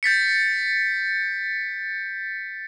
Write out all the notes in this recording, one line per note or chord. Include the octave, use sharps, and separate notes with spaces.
G6 A6 B6 C#7